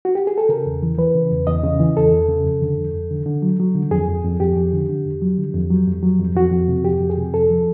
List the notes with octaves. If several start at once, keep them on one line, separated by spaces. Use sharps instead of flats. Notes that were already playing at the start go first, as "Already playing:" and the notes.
F#4
G4
G#4
A4
C#3 A#4
E2
E3
E3 B4
C#3
E2
E2 D#5
C#3
E3
E2 A4
E2
C#3
F2
D3
F2
F2
D3
D3
F#3
F#3
D3
F2 G#4
F2
F2
F2 G4
F2
D3
D3
F2
F#3
D3
F2
F#3
F2
F#3
F2
F2 F#4
F2
C3
F2 G4
F2
G#4
C3
F2 A4
F3